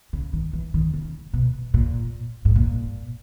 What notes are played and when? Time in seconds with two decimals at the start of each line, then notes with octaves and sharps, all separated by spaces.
0.13 C#3
0.33 D#3
0.53 E3
0.74 D#3
0.94 C#3
1.33 B2
1.74 A#2
2.45 G#2
2.56 A#2